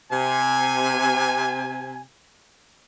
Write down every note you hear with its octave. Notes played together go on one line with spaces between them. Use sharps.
C3 G#5